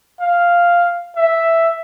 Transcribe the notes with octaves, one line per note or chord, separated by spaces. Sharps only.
F5
E5